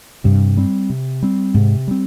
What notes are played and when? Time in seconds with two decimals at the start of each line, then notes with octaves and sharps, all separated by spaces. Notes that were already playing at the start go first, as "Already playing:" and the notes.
0.24 G2 C3
0.57 G3 C4
0.90 C3
1.23 G3 C4
1.54 G#2 C3
1.88 G3 C4